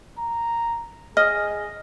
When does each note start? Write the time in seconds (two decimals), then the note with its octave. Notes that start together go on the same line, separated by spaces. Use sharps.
0.19 A#5
1.17 G#4 D#5 F6